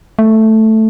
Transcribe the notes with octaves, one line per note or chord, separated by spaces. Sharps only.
A3